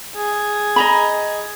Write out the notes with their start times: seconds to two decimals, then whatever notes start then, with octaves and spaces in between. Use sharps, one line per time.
0.16 G#4
0.76 D#5 A#5 B5